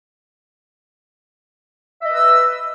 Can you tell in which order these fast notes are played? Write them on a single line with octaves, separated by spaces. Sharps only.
E5 D#5 B4 E6